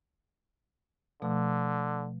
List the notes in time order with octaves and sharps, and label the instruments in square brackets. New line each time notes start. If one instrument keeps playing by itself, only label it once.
[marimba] B2 F3 A3 [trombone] D3